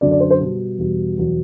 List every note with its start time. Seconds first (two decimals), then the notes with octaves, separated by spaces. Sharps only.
0.01 F#2 D3 F#3 D5
0.11 D5
0.20 C5
0.30 C5
0.41 B2 G3
0.78 E2 B2 G3
1.18 E2 B2 F#3